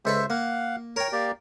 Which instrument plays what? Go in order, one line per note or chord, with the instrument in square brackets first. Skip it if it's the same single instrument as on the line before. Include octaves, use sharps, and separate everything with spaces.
[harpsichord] C#2 A4 B4 [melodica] C5 E5
[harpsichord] A#3 [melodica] F5 F#5
[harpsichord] A#4 G5 [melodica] C#5 A#5
[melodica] A#3 G4 D5